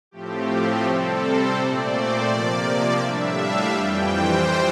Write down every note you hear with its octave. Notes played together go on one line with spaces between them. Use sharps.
A2 F3 A3 C4 G4
G4
C3 G3 C4 A4
C5
A#2 A3 C4 D5
C5
C3 F3 A#3 D5
A2 G3 D4 E5
F5
F2 E3 G3 G5
C5